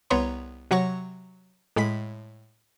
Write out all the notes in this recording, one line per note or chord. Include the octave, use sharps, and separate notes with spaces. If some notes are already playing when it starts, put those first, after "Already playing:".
C2 B3 B4 C#5 A#5 C6
C3 F#3 C#5 F#5 C#6 A#6
A2 G#3 B5 B6